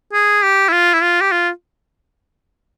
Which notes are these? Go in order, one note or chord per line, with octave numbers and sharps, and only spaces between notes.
G#4
G4
E4
F4
E4
F4
G4
F4